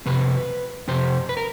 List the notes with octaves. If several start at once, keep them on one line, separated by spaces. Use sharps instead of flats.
F2 C3 B4
F2 C3 C5
B4
A#4